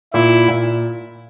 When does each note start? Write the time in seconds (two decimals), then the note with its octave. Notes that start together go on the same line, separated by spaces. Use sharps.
0.13 A#2 E4
0.48 A#2